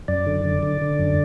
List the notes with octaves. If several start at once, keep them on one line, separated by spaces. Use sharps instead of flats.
F#2 D5
D3
D3
D3
D3
F#2